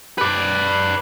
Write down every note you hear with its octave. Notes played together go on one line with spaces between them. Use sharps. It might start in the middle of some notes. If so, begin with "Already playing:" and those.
B4 D5